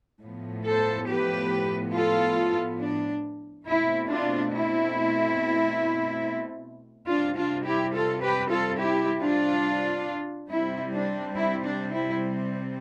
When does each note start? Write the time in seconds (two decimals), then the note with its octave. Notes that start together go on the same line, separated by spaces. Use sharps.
0.24 A2 F3 B3
0.68 A4 C5
1.10 G4 B4
1.95 F4 A4
2.82 D4
3.66 B2 A3 C4 E4
4.10 D4 F4
4.52 E4
7.08 C3 G3 C4 D4 F4
7.37 D4 F4
7.65 E4 G4
7.95 F4 A4
8.23 G4 B4
8.51 F4 A4
8.79 E4 G4
9.23 D4 F4
10.50 C3 G3 C4 E4
10.94 D4
11.36 E4
11.65 D4
11.93 E4